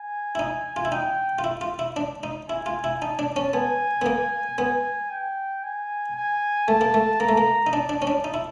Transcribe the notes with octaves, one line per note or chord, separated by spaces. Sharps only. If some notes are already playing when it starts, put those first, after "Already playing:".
Already playing: G#5
E4
D#4
F4
E4
D#4 G5
F4
E4
F4
E4
D4
D#4
E4 G#5
F4
E4
D#4 A5
D4
C#4
B3 G#5
B3
A#3
B3 G#5
G5
G#5
G#5
A3 A5
A#3
A3
A#3 A#5
A3
A#3
D#4
D4 A5
D4
C#4
D4
D#4
E4